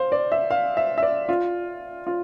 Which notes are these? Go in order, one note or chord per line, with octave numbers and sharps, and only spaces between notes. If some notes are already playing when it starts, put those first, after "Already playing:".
Already playing: C5 F5
D5
E5
F5
E5
E5
D5
F4
F4